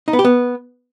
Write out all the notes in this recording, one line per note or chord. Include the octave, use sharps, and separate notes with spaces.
D#4
B3
G4
B3